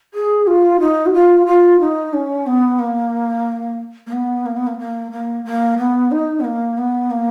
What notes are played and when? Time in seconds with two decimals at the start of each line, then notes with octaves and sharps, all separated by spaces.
0.14 G#4
0.47 F4
0.80 D#4
1.06 F#4
1.13 F4
1.47 F4
1.80 D#4
2.13 C#4
2.47 B3
2.79 A#3
4.07 A#3
4.12 B3
4.46 A#3
4.56 B3
4.67 A#3
4.79 A#3
5.12 A#3
5.45 A#3
5.78 B3
6.11 D#4
6.40 B3
6.44 A#3
6.78 B3
7.11 A#3